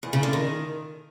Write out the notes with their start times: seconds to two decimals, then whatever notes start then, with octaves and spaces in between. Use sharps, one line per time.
0.03 E2
0.13 C#3
0.23 D3
0.33 D#3